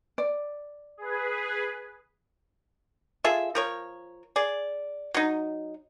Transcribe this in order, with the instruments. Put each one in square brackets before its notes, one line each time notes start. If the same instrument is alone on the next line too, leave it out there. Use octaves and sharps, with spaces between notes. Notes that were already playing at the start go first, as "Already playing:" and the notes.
[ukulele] D5
[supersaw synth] G#4 B4
[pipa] F4 G#4 A4 E5
F3 A#4 C#5
G#4 D5
F#3 D#4